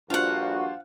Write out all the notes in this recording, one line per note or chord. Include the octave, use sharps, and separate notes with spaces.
A#1 G2 D4 F4 F#4 C5 F5 F#5